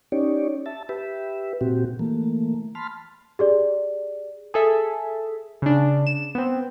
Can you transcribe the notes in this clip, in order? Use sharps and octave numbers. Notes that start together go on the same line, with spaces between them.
C#4 D#4 G4 C#5 D5
E5 A5
G4 B4 E5
A#2 C4 F#4 G4
E3 A3 A#3
A5 B5 C6 F6
G4 G#4 D5
G#4 A4 E5
C#3 D4
E7
B3 C4